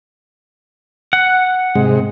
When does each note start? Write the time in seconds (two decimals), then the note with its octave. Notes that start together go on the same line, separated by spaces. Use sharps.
1.13 F#5
1.75 G#2 C3 G#3